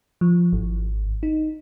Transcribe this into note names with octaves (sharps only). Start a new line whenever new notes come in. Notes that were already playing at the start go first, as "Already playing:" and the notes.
F3
G#1
D#4